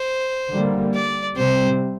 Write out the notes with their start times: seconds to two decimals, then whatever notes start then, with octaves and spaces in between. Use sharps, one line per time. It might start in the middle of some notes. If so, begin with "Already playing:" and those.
Already playing: C5
0.52 D3 G3 A#3
0.95 D5
1.37 C3 G3 C4 C5